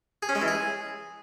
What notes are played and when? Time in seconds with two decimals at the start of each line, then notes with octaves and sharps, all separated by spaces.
0.22 G#4
0.29 C#4
0.35 G#3
0.41 E3
0.48 G#4